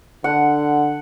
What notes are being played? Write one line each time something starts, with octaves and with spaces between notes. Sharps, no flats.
D3 F#5